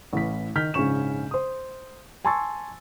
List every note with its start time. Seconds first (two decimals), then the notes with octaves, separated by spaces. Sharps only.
0.13 A1 E3 B6
0.55 D#3 F6 G6 B6
0.74 A#1 G#2 C#3 C#4 C#6 E7
1.31 C5 D#6
2.25 G#5 A5 C6 C#6 E6 A6